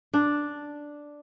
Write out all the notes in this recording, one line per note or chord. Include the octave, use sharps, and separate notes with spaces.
D4